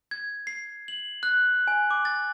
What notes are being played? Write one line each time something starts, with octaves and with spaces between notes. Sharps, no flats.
G#6
C7
F#7
F#6
G#5
D6
A6